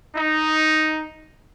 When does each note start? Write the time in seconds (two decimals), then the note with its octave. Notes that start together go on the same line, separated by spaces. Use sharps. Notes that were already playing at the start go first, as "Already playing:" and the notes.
0.16 D#4